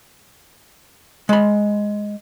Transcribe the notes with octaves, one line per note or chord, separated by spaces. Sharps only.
G#3 B5